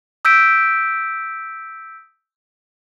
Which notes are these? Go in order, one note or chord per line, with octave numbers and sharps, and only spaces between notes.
D#6 E6 G6 B6 D7